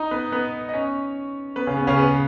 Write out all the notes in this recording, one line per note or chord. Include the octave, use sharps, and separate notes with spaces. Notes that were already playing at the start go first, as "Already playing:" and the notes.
Already playing: D#4 D#5
B3 B4
B3 B4
D#5
C#4 C#5
B3 B4
C#3 C#4
B3
C#3 C#4
B3 B4